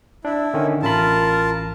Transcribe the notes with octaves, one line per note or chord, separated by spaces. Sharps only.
D4 E4
D3 D#3 C#4
A1 F4 A#4 A5 B5